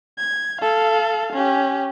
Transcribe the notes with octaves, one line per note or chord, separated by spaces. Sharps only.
G#6
A4 F5
C#4 G4